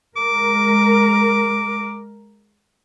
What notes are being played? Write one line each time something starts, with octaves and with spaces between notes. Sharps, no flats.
G#3 A#4 D6